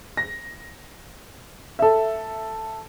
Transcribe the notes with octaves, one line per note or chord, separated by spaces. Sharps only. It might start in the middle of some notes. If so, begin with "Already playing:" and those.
A#6
A4 E5